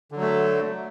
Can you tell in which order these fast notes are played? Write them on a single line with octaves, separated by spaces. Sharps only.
D3 F#3 A3